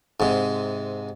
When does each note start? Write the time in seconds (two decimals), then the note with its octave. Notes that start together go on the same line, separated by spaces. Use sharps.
0.20 G#2 C3